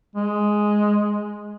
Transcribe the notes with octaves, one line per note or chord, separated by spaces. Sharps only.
G#3